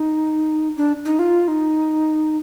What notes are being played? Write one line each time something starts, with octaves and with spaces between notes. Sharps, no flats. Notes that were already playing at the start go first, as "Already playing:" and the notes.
Already playing: D#4
D4
D#4
F4
D#4